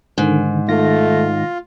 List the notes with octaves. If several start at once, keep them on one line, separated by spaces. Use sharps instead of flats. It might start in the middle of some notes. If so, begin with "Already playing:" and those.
G#2 D3 D#3
D#3 A3 F4 A#6